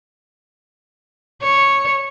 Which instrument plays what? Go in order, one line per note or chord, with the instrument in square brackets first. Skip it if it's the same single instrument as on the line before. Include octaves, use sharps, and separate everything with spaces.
[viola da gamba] C#5